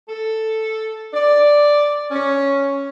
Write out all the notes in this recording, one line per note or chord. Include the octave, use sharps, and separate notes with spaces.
A4
D5
C#4